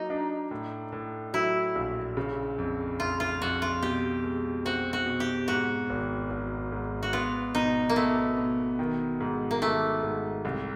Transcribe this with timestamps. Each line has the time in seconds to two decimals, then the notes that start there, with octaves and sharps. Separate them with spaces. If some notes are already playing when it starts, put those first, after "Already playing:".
Already playing: F#3 A#3 D#4
0.10 D4
0.51 A2
0.92 A2
1.34 F#3 E4
1.75 A#1
2.17 C#3
2.58 F2
3.00 F2 F4
3.20 F4
3.41 F2 F#4
3.62 F4
3.83 B2 G4
4.24 G#3
4.65 C4 F#4
4.93 F#4
5.07 B2
5.20 G4
5.48 G#2 F#4
5.90 G#1
6.30 G#1
6.72 G#2
7.03 F#4
7.13 B3 F4
7.55 B2 D#4
7.89 A#3
7.96 A3 B3
8.37 B2
8.79 D#3
9.20 G#2
9.51 A#3
9.62 D#3 A3
10.03 G#2
10.45 C2